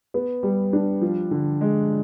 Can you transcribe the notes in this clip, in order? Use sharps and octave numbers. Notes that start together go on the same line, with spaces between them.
B3
G3
D4
F3
D3
G#3